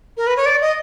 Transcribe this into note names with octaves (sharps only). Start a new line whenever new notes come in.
A#4
B4
C#5
D5
D#5